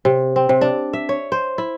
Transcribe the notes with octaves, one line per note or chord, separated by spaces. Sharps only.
C3
C4
C3
D4
E5
C#5
C5
E4